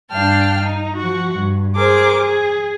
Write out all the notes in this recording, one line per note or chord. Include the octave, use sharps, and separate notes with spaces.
G2 D4 F5 G5 A5 F6
D#4
F3 F#4
G2
G#4 A#4 C5 D6
G#4